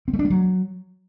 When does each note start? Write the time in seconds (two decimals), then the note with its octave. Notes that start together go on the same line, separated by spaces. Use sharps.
0.08 C4
0.13 A3
0.19 D4
0.25 A3
0.30 F#3